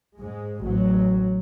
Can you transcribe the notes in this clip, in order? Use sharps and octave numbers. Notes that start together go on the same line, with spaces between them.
G#2 G#3
A1 F#3